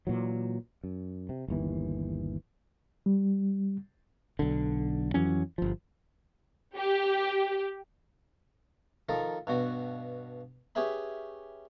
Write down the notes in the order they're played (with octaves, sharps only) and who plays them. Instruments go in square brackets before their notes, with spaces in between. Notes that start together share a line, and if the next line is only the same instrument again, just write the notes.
[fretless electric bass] A#2 E3 F#3
F#2
C3
G1 D#2 E3
[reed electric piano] G3
[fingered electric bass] B1 D3
F2 E3 F#3 C#4
G1 F3
[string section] G4
[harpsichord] D#3 F3 A4 A#4
G2 B2 F#4
C#4 G4 G#4 B4 E5 B5